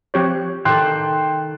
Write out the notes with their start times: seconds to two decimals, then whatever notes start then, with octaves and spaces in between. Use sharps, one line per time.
0.14 F3 C4 G4 C#5 F#6
0.65 A2 D#3 A4 G5 C6 D6 F#6